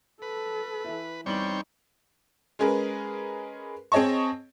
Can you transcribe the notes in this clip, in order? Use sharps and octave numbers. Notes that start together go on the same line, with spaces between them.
A4 B4
E3 E4
E2 G3 C4 D#4 C#5 G5 C#6 F#7
G#3 C#4 G#4 A#4 B4
C4 G#4 C#5 D#5 A5 C#6